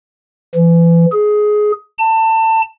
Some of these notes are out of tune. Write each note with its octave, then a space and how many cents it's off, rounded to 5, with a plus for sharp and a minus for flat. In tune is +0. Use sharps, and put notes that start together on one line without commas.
E3 +30
G#4 +15
A5 +25